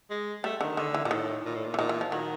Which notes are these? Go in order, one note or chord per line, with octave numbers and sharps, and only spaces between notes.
G#3
G3 A3
D3 D#3
D3 D#3
E3
A#2 D3
A2 D#3
A#2
A2
A#2
E3
A#2 D#3
E3
F3
D#3 F#3